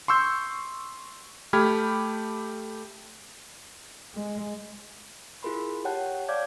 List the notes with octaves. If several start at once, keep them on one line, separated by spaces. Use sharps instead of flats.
C6 C#6 E6 G6
A3 G4 B5 F6 G#6
G#3
E4 F4 G#4 A#4 B5 C6
G4 C#5 F#5 G5 A5 F#6
C#5 D5 F5 D6 G6 G#6